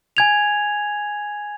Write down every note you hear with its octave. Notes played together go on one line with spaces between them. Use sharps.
G#5 G#6 F7